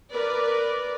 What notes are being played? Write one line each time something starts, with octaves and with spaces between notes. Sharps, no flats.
A#4 B4 D5